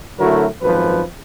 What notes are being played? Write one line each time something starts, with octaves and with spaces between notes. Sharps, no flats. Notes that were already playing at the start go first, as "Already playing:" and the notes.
D3 F#3 A3 E4 F#4 A#4
G#1 F#2 F3 B4